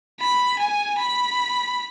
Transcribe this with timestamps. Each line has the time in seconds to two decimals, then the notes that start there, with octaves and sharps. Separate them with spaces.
0.20 B5
0.59 G#5
0.98 B5